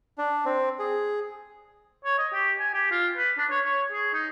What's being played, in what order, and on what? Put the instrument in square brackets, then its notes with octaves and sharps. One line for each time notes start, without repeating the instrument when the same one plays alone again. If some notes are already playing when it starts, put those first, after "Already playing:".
[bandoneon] D4
C4
G#4
[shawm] C#5
D#5
G4
G#5
G4
F4
B4
D4
C#5
C#5
G#4
D#4